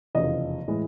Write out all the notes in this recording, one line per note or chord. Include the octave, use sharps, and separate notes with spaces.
F1 E2 C#3 F3 D#5
A2 E3 G#3